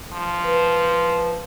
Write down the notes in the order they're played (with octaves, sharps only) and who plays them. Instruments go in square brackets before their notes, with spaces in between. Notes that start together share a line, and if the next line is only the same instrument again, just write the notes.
[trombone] F3
[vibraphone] B4